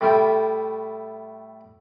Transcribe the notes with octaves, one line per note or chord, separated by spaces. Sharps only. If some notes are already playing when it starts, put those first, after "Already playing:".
A2 G3 A3 F4 E5 G5